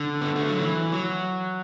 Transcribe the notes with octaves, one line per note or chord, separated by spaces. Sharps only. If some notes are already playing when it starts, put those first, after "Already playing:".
Already playing: D3
B3
A3
F#3
E3
F#3